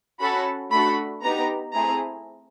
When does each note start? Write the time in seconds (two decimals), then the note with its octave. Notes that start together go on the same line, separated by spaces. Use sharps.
0.20 C#4 F#4 A4 B5
0.71 A3 D4 F#4 A4 B5
1.23 B3 D#4 G4 A#5
1.73 A3 C4 E4 G#4 A#5